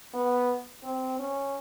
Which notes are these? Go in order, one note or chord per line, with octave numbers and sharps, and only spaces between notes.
B3
C4
C#4